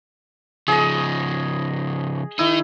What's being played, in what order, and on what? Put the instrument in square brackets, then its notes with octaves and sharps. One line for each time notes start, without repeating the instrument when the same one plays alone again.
[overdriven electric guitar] C#3 F3 [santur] G#4 D#5
[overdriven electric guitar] D#3 D#4 [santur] E4